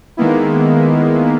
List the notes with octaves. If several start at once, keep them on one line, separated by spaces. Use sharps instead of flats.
D#3 G#3 A#3 B3 E4